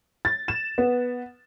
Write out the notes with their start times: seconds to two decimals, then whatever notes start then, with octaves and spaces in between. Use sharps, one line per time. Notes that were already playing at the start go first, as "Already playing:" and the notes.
0.25 A6
0.48 E7
0.78 B3